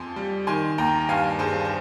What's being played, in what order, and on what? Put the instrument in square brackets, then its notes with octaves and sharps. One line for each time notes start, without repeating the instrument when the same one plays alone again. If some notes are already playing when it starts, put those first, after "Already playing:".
Already playing: [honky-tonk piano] F2 F3 G#5 C6
G3
D#3 G#5 C6
D#2 G5 A#5
G2 F5 G#5
G2 G#4 C5
C5